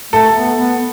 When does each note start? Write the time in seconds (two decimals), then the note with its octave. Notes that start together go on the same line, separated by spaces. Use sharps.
0.13 A3 A4
0.36 B3
0.58 B3